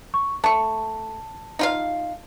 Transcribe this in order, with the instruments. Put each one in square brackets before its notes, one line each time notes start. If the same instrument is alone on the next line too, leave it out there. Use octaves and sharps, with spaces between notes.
[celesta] C#6
[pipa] A3 C#6 [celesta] A5
[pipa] D#4 F4 F5